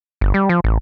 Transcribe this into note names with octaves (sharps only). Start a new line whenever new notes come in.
G1
G3
F3
A1